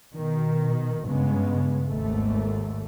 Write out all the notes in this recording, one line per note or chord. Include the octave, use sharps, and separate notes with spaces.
B2 D#3
G2 C#3 G#3 B3
G#1 D#2 G#2 A3